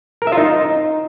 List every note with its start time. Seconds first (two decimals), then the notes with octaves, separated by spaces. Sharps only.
0.22 A#4
0.27 E5
0.32 F4
0.38 D#4